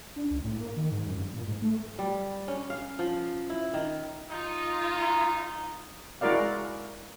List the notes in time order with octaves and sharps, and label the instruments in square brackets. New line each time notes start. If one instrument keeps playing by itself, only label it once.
[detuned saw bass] D4
C#2
A2
A#3
D#3
G#2
F#2
G2
A#2
G#2
A3
[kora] G3
C#4
F5
F3
E4
D#3
[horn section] D#4 [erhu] F4
[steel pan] G#3 E4 F#4 A#4 D5 F5